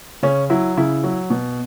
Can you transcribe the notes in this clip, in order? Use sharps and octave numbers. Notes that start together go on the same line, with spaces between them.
C#3 C#4
F#3 E4
C#3 E4
F#3
B2